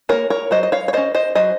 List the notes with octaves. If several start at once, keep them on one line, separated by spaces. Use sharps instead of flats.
A#3 C#4 A#4 C#5
A#4 C#5
F#3 C5 D#5
D#5
C#5 F5
C#5
A#3 C#4 C5 D#5
C5 D#5
F#3 C5 D#5